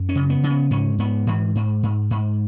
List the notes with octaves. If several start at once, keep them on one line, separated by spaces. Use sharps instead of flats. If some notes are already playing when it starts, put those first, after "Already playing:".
Already playing: F#2
C#4
C#3
B3
C#3
B3
G#2 C#4
G#2 B3
G#2 E3
G#2
G#2
G#2